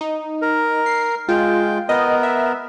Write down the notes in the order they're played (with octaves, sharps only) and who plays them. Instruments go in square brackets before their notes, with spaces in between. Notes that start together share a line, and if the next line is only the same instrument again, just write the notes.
[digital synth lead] D#4
[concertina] A#4
[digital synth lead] C7
[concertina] G#3 G5 [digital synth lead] F4
[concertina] B3 A#4 [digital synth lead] D#5
[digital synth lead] E5